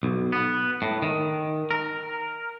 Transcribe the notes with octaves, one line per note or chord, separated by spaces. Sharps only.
B1
B3
A2
D#3
A#4